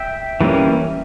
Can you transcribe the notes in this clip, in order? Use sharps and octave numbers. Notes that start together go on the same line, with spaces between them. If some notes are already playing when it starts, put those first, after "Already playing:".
Already playing: E5 G5
E3 G3 A#3 C#4